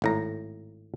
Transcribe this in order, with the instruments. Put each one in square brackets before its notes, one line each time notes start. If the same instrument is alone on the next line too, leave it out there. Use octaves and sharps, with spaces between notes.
[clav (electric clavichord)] G#1 A2 A#5